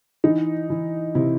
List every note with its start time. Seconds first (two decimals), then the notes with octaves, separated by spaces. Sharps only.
0.24 E3 D#4
0.70 E3
1.15 C3 E4